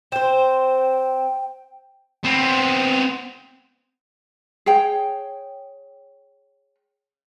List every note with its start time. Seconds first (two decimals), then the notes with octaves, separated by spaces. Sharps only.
0.12 C4 C5 G5
2.24 B3 C4
4.66 G#4 C#5 G5